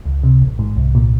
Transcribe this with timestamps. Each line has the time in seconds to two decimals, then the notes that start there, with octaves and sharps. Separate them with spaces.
0.06 C#2
0.24 C3
0.42 A1
0.59 G#2
0.77 C2
0.95 A#2